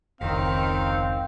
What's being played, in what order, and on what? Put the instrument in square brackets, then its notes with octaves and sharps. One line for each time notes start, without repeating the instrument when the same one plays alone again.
[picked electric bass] F1 C#2 [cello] D#3 [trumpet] C4 [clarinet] F5